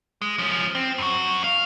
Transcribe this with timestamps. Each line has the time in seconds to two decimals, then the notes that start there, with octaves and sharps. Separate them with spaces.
0.22 G#3
0.38 F3 C#4
0.75 C4
0.98 F#2 F#4
1.44 F5